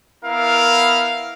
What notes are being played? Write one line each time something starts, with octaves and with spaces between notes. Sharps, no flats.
B3 E4 A#4 F5